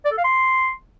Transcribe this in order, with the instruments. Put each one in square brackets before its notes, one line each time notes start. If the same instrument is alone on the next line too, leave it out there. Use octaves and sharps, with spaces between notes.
[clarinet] D5
A4
F5
C6